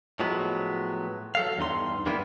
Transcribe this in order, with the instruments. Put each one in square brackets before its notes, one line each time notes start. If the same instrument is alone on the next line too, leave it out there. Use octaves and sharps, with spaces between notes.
[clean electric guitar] A2 F3 F#3 G#3 B3
F#3 A4 F5
E2 G2 D#4 C6
G2 E3 A#3 B3 E4